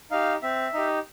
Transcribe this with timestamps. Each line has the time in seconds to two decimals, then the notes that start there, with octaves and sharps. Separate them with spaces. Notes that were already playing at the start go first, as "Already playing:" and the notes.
0.11 D#4 G4 F5
0.42 C4 E5
0.74 D#4 G4